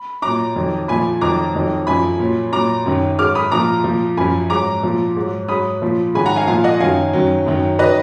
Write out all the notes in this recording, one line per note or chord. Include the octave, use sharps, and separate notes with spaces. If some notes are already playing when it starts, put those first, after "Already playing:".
Already playing: B5
A#2 F#3 A#5 D6
F2 D#3 F#3
A#2 F3 G#5 B5
F2 D#3 F#3 A#5 D6
F2 D#3 F#3
F#2 F3 G#5 B5
A#2 F#3
A#2 F#3 A#5 D6
F#2 D#3 F#3
G#2 F#3 D6 F6
B5 D#6
A#2 F3 A#5 D6
A#2 F3
F#2 F3 G#5 B5
G#2 F#3 A#5 D6
A#2 F3
G#2 F#3
G#2 F#3 B5 D#6
A#2 F3
G#2 D#3 F#3 G#5 B5
F#5 A#5
F5 G#5
A#2 F3 F5 G#5
D#5 F#5
F#2 D#3 F#3 F5 G#5
F#2 D#3 F#3
F#2 D#3 F#3
D#3 F#3 B4 D#5